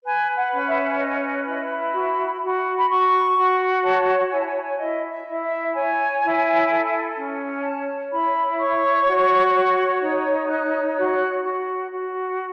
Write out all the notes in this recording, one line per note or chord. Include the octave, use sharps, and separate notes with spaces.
B4 G#5
F#5
C#4
E5
B4 D#5
D#5
E4 D#5
B5
F#4
F#4
B5
F#4 C#6
F#4
C#5 A5
E4 G#5
A5
G#5
A5
G#5
E4 D#5
E5
E4
E5
C#5 G#5
E4
A4
C#4
C#5 A5
E4 B5
C#5 C#6
F#4
C#5
D#4
C#5 F#6
F#4 F#6
F#4
F#4